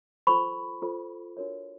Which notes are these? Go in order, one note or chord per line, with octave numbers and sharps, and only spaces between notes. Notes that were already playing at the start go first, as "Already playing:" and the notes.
F4 A4 C5 B5 C#6
F4 A4 C5
D4 F#4 A#4 C#5